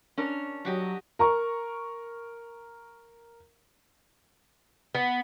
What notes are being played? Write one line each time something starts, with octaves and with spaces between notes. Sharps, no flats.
C#4 D4 A#4
F#3 F#4 G4 D#5
A#4 A#5 C#6
B3